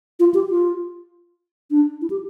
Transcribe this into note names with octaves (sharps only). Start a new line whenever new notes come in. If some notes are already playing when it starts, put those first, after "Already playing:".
F4
G4
F4
D4
E4
G4